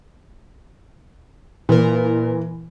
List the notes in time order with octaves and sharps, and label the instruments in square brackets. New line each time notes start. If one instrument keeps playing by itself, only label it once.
[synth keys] A#2 A#4 [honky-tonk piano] E3